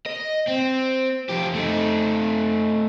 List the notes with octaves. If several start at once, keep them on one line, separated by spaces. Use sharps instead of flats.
D#5
C4
F2 G4
A3 D#4